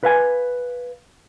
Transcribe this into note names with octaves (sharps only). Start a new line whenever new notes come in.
B4 F5 G#5